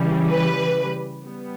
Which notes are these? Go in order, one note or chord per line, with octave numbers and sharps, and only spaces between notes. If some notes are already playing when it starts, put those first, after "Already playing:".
Already playing: C#3 E3 G3
B4
G3 B3